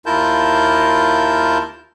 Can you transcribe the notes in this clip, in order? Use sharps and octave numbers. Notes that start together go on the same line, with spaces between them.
D#2 E4 F4 A#4 A5 G6